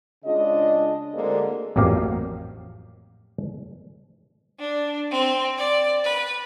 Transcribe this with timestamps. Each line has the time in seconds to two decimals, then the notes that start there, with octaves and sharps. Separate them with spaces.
0.24 C#3 G#3 D4 F4 D#5
1.13 D2 D3 G#3 A#3 C4 D5
1.76 A1 F2 F#3 A#3 G4 F5
4.60 D4
5.12 C4
5.58 D5
6.05 B4